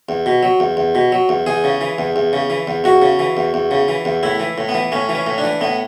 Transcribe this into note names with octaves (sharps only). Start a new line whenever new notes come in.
E2
B2
F#3
E2
E2
B2
F#3
E2
E2 G#4
C#3
E3
E2
E2
C#3
E3
E2
E2 F#4
C#3
E3
E2
E2
C#3
E3
E2
A2 E4
E3
A2
B3
E3
A2 C#4
E3
C#4
A2
D4
E3
A2 B3